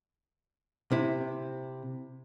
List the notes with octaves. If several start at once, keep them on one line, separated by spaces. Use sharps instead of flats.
C3 E4